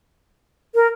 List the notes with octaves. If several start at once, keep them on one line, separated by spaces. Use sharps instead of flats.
A#4